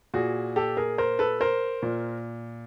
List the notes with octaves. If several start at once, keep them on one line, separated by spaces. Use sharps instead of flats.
A#2 F#4 G#4
G4 A4
G#4 A#4
A#4 C5
A4 B4
A#4 C5
A#2